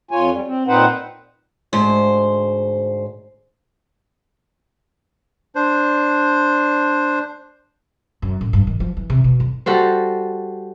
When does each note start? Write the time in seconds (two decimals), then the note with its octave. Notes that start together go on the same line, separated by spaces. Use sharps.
0.11 F2 F4 C#5 G#5
0.32 G3
0.45 C4
0.67 A#2 C4 D#4 B4 C5 F#5
1.73 D2 G#2 C5
5.55 D4 C5
8.22 F#2
8.41 A2
8.53 G2
8.67 D#3
8.80 F3
8.97 E3
9.10 C3
9.24 B2
9.40 F2
9.66 G3 F#4 A4 C5